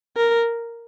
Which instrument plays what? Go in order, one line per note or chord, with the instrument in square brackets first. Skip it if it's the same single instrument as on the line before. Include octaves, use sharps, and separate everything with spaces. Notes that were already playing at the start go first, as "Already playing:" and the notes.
[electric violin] A#4